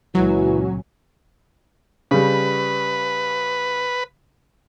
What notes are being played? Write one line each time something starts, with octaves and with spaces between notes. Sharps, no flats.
C#2 A#2 E3 F#3 C#4 F#4
C#3 G3 B4